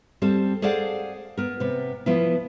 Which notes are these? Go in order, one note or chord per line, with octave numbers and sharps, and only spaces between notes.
G3 C4 A4 A5
G#4 A4 C5 D5 F5 F#5
B3 A#4
C3 B3
F3 B3 E4